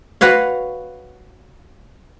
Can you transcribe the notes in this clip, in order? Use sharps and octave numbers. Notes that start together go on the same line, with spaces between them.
F#4 B4 C#5 F5